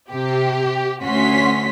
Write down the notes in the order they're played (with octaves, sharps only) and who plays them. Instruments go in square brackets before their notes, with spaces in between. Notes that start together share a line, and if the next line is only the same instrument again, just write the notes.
[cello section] C3 [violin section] G4
[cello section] D2 C#4 [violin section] F#4 C6 B6